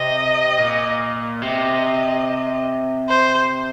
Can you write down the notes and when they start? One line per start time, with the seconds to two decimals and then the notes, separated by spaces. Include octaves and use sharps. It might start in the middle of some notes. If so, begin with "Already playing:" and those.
Already playing: C3 D#5
0.58 A#2
1.42 C3 D#5
3.09 C5